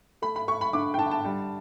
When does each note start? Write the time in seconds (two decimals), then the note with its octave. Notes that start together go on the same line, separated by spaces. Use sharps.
0.22 A3 B5
0.36 B5
0.48 A3 C#6
0.61 B5
0.73 D3 D6
0.94 G5
0.98 D3 A5
1.11 A5
1.25 G3